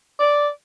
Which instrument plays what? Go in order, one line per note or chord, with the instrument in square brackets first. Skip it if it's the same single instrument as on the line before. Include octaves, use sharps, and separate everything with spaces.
[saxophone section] D5